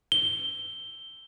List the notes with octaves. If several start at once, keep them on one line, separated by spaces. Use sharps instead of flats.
G7